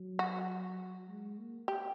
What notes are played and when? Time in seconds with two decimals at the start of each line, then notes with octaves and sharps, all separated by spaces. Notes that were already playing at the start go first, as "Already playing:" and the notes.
Already playing: F#3
0.19 F#4
1.08 G#3
1.38 A#3
1.68 G4